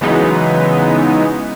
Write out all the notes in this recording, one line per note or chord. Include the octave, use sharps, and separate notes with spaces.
C#3 E3 F#3 G#3 B3 D#4